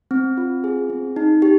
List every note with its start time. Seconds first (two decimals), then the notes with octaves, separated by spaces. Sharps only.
0.11 C4
0.37 F4
0.64 G#4
0.90 C4
1.16 D#4
1.42 G4